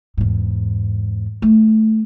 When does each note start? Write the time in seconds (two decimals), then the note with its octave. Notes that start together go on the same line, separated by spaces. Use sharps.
0.17 E2 G#2
1.42 A3